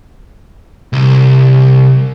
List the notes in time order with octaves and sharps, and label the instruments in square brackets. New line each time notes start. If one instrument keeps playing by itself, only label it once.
[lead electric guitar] C2